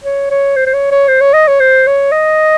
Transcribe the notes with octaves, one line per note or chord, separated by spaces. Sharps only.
C#5
C#5
C5
C5
C#5
C#5
C5
C#5
D#5
C#5
C5
C#5
D#5